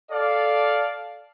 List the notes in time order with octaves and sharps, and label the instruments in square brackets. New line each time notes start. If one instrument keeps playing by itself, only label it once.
[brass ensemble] A4 D5 F5